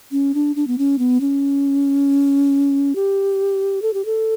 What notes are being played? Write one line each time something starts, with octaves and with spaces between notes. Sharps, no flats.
C#4
D4
D4
B3
C#4
B3
C#4
G4
A4
G4
A4